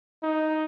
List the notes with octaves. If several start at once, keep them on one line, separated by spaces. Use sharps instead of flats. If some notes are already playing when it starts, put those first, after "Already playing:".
D#4